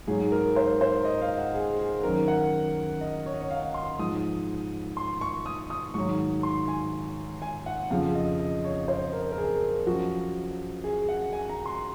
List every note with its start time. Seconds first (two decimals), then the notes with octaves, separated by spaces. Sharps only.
0.07 G#2 F#3 G#4
0.32 A#4
0.56 C5
0.81 C5
1.05 D#5
1.22 F5
1.38 F#5
1.54 G#4
1.79 G#4
2.03 F#2 D#3 F#3 A#4
2.28 F#5
3.01 D#5
3.26 C#5
3.34 D#5
3.41 C#5
3.51 F5
3.74 C6
3.99 G#2 F3 D#6
4.97 C6
5.21 C#6
5.46 D#6
5.70 D#6
5.94 G#2 D#3 F#3 C#6
6.43 C6
6.68 G#5
7.42 G#5
7.66 F#5
7.90 F2 C#3 F3 F5
8.15 D#5
8.39 D#5
8.64 C#5
8.88 C5
9.13 A#4
9.32 A#4
9.38 G#4
9.86 F#2 F3 F#4
10.84 G#4
11.09 F#5
11.33 G#5
11.50 A#5
11.66 C6